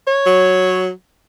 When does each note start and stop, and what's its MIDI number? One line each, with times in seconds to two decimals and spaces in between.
0.07 0.91 73
0.26 0.90 54